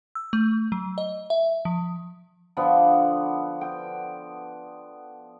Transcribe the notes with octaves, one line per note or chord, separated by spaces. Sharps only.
E6
A3
F#3
D#5
E5
F3
D3 F3 B3
G5